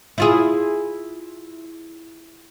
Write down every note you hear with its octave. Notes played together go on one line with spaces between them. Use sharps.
E4 F4 G#4